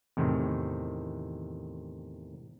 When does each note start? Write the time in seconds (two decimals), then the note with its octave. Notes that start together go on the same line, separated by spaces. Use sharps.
0.17 E2 A2 C3 D#3